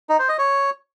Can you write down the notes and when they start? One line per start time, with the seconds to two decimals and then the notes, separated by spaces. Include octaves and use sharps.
0.09 D#4
0.19 C5
0.29 D#5
0.38 C#5